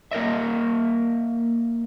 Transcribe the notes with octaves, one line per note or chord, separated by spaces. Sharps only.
A#3 A#4 D#5 E5